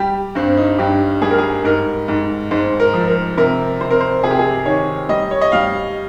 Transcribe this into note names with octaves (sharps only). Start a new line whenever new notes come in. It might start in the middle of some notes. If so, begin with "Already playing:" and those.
Already playing: G3 G4
G2 C4
D#4
G2 G4
G3 G#4
A#4
G#4
G#2 A#4
G#2
G#2 C5
A#4
F3
A#4
C3 A#4
C3 C5
A#4
C5
C3 G#4
G4
G#4
D#3 C#5
G3 D#5
C#5
D#5
G3 F5